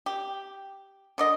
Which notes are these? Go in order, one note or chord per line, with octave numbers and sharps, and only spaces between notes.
G4
D3 D5 D#5